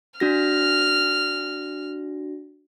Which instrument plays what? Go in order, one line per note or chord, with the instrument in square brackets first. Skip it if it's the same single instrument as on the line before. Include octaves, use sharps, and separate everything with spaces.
[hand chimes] D4 F#4 A#6 [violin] F6